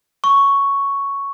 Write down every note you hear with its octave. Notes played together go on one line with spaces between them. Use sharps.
C#6